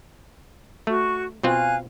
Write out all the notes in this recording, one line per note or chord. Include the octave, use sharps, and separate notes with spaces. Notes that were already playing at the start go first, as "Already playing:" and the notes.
A3 F#4 C#6
B2 C4 F4 F5 G#5 F#6